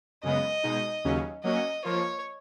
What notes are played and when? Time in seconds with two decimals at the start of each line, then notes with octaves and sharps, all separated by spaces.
0.23 F#2 C#3 G#3 B3 D#5
0.63 B2 G#3 D#4
1.04 D#2 C#3 F#3 C#4
1.44 F#3 A#3 C#4 F#4 D#5
1.84 F3 A#3 F4 C#5